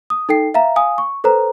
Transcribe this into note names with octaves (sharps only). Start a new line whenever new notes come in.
D#6
D#4 A4 G5 C7
E5 F5 A#5
F5 G#5 D#6
C#6
A4 B4 C5 A#5